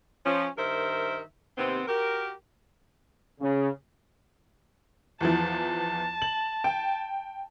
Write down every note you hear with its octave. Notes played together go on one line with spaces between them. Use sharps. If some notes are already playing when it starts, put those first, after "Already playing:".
F3 C#4
G2 D#3 A#4 C5 E5
D#2 C3 B3 C4
F#4 G4 A#4
C#3
E2 E3 F3 A5
F#7
G5